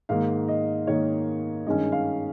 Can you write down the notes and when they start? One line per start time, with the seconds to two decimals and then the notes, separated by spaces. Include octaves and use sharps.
0.09 G#2 D#3 A#3 F5
0.48 D#5
0.87 G#2 D#3 A#3 C#5
1.66 G2 D#3 G#3 C#4 D#5
1.92 F5